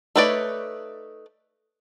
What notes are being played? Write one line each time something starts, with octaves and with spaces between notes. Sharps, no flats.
A3 D#4 B4 C#5 D5